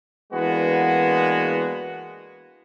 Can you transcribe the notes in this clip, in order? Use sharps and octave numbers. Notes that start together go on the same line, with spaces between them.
E3 G#3 A#3 B3 D4 F#4